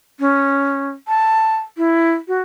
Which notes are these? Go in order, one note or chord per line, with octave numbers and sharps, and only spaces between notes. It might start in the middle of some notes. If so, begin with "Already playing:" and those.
C#4
A5
E4
F#4